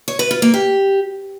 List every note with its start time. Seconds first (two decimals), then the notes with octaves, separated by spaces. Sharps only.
0.08 C#5
0.19 B4
0.31 F4
0.42 A#3
0.54 G4